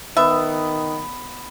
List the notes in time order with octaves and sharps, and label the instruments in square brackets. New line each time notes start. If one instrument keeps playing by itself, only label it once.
[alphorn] D#3 [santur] B3 [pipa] E5